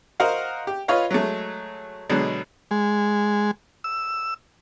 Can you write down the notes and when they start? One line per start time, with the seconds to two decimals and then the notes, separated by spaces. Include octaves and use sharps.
0.20 F#4 A#4 C5 D#5 F5 F#5
0.67 G4
0.88 F4 B4 C#5 D#5 F5
1.11 F#3 G#3 A3
2.09 B2 D3 F#3 G#3
2.71 G#3
3.84 E6